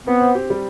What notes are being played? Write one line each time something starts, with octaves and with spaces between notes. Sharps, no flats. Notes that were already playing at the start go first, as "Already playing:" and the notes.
B3 C4
C5
G4
G3